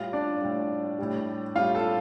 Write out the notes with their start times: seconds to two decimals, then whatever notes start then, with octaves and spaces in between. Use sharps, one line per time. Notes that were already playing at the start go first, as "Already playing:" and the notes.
Already playing: A2 G3 F4
0.13 D4 D5
0.41 A2 G3
0.99 A2 G3
1.56 A2 G3 F4 F5
1.75 A4 A5